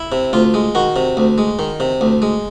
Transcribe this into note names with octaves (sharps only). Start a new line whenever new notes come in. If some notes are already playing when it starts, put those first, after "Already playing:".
Already playing: E4
C3
D2 F4
G#3
D#3 F#4
C3
D2
G#3
D#3
C3
D2
G#3